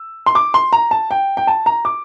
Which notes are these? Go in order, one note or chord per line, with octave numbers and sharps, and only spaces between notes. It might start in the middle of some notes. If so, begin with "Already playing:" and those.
Already playing: E6
C6
D6
C6
A#5
A5
G5
G5
A5
A#5
D6